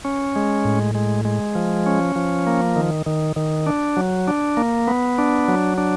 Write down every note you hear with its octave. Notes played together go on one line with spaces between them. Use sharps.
C#4
G#3
A2
G#3
G#3
F3
C#4
F3
A#3
D#3
D#3
D#3
D4
F#3
D4
A#3
B3
D4
F#3
D4